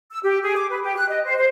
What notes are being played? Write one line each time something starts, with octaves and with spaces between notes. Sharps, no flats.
E6
G4
G#4
D6
B4
G4
F#6
D#5
C5
C5